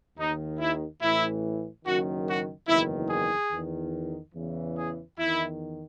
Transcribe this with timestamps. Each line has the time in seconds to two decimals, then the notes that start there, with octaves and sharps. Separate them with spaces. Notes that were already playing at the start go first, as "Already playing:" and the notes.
0.18 D#2 D#3 D#4
0.59 E4
1.01 A1 A2 E3 E4
1.85 F#1 F#2 D#3 F#4
2.27 F#4
2.67 F#1 E2 D#3 E4
3.09 G#4
3.51 E2 D#3
4.34 E2 C#3 E3
4.76 G#4
5.17 E2 D#3 E4